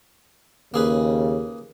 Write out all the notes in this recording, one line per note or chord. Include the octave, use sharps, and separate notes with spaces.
D#2 C#3 A#3 G#4 B4